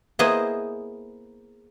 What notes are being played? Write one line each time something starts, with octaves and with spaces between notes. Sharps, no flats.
A#3 B3 E4 G#4 C5 D#5